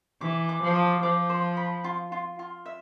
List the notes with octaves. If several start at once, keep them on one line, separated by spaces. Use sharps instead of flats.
E3 D6
D6
F3
D6
F3 D6
C5
B5
F4
F4
F4
E5